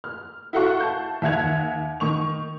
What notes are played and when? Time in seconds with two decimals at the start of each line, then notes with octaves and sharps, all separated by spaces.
0.04 F6
0.53 E4 F#4 A4 F5 F#5 C#6
0.80 A5 G6
1.22 D#2 E5 F#5 G#6 F7
2.00 D#3 C#6 F7